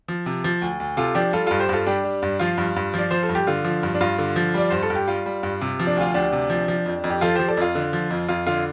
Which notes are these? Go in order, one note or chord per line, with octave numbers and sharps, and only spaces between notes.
F3
C3
F3
D2
D2
C3 F4 A4
F3 D4 G4
G3 F4 A4
G2 F4 A4
G4 C5
G2 F4 A4
G3 D4 G4
G3
G2
F3 F4
G2
G2
F3 D5
F3 C5
A4
G2
G4
D3 F4
F3
G2
D4
G2 F4
D3
F3
G3 D5
G2 C5
A4
G2
G4
G3 F4
G3
G2
C3
F3
D4
D2 F4
D2 D4 G4
C3
F3
F3
F2
F2
G4
F3 F4 A4
F3 G4 C5
A4 D5
F2 F4
D3
F3
F2
F2 F4
D3 F4